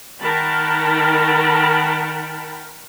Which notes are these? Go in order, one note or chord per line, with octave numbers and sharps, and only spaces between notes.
D#3 A#4 F#5 G5 A5 B5